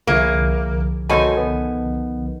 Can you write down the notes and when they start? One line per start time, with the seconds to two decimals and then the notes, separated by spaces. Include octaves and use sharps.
0.07 C2 D3 F3 A#3 E4 G#4 C#5
1.09 B2 D#3 D#4 F#4 A4 C5 C#5 G#5
1.37 B3